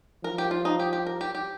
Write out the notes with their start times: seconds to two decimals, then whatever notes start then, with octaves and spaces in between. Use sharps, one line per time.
0.24 F3 A#4
0.38 G4
0.51 F4
0.65 D#4
0.80 G4
0.93 G4
1.07 A#4
1.21 G4
1.35 G4